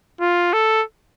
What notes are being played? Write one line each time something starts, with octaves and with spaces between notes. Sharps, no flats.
F4
A4